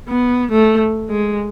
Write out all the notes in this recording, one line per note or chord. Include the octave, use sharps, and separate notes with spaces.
B3
A3
G#3